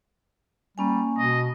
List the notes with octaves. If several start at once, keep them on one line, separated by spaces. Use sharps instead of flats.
G3 A#3 C#4 G#5
B2 D#5